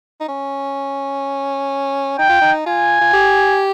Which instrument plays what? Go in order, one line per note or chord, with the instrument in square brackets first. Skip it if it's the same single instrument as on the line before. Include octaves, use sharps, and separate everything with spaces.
[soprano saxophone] D#4
C#4
[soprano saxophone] D#4 [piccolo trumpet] G5
[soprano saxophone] F4
D#4
[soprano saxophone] F4 [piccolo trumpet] G#5
[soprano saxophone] F4
G4